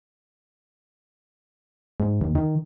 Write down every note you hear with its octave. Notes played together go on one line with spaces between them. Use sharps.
G#2
D#2
D#3